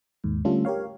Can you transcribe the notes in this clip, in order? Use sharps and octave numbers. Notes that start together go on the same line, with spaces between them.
D#2 G#2
D3 G3 A3 C#4 F4 A4
G4 A#4 C#5 F5